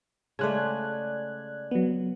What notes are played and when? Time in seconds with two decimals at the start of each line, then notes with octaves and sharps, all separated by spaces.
0.39 C#3 G#3 A3 D5 F#6 G#6
1.71 F#3 B3